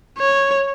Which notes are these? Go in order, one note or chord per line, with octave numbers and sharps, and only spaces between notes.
C#5